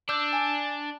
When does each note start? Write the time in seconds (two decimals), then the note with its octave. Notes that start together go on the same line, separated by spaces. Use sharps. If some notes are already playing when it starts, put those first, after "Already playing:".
0.09 D4 D6 E6 G6
0.33 G#5